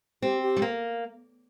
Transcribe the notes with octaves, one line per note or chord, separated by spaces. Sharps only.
C4 G4
G4
G3
A#3